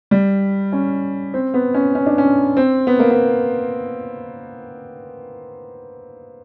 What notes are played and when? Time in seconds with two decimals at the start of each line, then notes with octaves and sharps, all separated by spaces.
0.11 G3
0.72 C#4
1.34 C4
1.54 B3
1.74 C#4
1.95 C#4
2.06 D4
2.18 C#4
2.57 C4
2.87 B3
2.99 A#3
3.11 B3